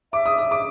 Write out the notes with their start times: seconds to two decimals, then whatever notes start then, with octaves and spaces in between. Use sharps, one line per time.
0.13 E5 D6
0.26 D#6
0.38 D#6
0.51 D6